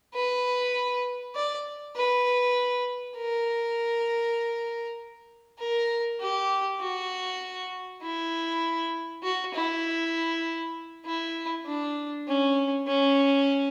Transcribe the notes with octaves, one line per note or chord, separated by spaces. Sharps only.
B4
D5
B4
A#4
A#4
G4
F#4
E4
F#4
E4
E4
D4
C#4
C#4